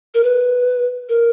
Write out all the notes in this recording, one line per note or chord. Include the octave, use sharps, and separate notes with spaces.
A#4
B4
A#4